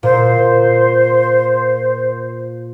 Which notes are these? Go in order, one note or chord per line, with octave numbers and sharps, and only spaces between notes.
A#2 C5